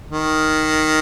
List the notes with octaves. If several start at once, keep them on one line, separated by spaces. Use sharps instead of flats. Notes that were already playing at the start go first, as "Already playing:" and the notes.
D#3